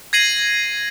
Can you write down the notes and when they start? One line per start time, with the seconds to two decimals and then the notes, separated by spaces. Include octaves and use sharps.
0.13 G#6 A#6 C7 D#7 F#7